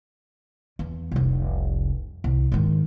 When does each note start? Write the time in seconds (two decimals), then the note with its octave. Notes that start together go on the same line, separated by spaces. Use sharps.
0.79 E2
1.12 F1 C2
2.24 C2
2.52 G#2 D#3